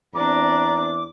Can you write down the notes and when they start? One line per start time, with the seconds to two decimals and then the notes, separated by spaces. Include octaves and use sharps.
0.15 E2 C4 D4 A#5 D6